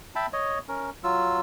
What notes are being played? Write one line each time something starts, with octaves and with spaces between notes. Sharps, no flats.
E5 G5 A5 B5
C#5 D#5
C#4 A#4
F#3 F4 E6